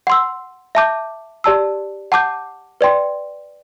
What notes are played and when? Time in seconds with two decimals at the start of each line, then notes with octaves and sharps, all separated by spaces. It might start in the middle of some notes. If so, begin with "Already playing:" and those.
0.07 F#5 C6 E6
0.75 E5 A5 D6 G6
1.44 G4 D5 A5 E6
2.12 F#5 A5 D6 G6
2.81 B4 D5 G5 C6